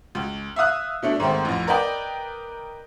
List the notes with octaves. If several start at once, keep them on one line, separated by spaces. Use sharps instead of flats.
C#2
E5 F5 D#6 F#6
B2 A3 D4
G#2 D#3 A3 C4
A1 F2
A#4 B4 D5 D#5 G5